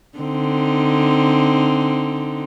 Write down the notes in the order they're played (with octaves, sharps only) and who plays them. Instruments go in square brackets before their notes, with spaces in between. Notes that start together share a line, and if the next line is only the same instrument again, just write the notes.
[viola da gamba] D3 C4 D#4